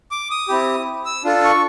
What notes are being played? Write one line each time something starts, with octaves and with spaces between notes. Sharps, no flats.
D6
D#6
C4 E4 G4
E6
D4 F4 A4
C#6